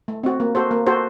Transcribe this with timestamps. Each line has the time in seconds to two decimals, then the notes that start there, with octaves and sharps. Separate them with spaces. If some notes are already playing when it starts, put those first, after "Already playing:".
0.08 A3
0.24 C4 F#4
0.40 A#3
0.55 F#4 A4 C5
0.71 A#3
0.87 F#4 A4 C5